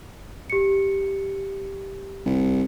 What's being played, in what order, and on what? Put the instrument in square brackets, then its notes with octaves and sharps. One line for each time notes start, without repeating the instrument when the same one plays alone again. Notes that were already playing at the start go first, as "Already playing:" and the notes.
[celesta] G4 C#7
[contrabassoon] C2